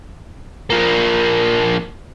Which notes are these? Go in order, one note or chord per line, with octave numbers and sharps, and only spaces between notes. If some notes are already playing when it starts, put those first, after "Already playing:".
F3 A#3